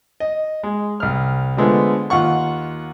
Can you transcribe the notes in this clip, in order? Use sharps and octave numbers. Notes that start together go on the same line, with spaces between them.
D#5
G#3
C2 F6
D3 F3 G#3 A3 B3
D#2 F4 F#5 C#6